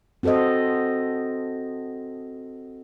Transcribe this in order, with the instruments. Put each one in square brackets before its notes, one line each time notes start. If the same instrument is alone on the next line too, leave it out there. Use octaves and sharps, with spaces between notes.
[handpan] C4 F#4 A4 C5 D#5